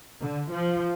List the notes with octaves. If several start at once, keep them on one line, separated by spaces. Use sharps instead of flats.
D3
F3